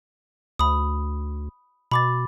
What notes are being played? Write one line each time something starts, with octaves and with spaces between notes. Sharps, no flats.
D2 B5 D#6
B2 B5 D6 A6